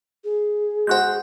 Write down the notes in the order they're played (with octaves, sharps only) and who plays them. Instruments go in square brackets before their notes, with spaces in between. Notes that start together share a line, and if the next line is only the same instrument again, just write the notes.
[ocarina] G#4
[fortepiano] G#3 F#4 C5 [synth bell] F#5 F#6 G6